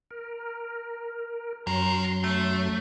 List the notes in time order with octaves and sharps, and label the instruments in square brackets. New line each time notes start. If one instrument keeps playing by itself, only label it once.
[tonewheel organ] A#4
[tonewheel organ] F#2 F#3 C6 [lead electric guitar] G4 A#4
[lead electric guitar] A3